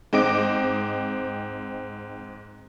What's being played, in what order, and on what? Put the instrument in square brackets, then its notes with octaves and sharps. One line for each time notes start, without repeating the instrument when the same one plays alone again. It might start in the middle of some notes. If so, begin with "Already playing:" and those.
[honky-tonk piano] G#2 C4 D#5 D6 D7